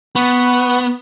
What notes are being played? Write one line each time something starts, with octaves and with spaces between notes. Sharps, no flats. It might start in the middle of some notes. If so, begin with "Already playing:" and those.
B3 F#5 B5 C#6